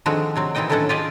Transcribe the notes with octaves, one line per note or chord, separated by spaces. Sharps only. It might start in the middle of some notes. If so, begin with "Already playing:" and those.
D3 D#3 F3 G#3 C4 F#4
C3 F#3 C4
A#2 E3 C4 D#4 D#5 G5
A2 D3 D#3 C#4 A4 F#5
F4 G4 G#4 D#5